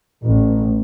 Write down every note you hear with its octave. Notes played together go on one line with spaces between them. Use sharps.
A1